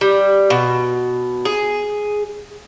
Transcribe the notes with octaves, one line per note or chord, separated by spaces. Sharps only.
G3
B2
G#4